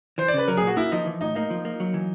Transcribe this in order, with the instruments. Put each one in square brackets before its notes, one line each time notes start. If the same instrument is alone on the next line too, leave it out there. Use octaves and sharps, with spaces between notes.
[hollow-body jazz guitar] E3 [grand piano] C5
[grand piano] D5
[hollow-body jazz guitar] C#3 [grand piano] B4
[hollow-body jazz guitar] F#3 [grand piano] A#4
[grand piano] G#4
[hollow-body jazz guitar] A#2
[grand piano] F#4
[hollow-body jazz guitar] A#3 [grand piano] E4
[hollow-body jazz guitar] F3 [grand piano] D#4
[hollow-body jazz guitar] E3
[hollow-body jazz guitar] A2 [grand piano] D#4
[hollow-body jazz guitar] A#3 [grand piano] D#4
[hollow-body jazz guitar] F3
A#3
F#3
E3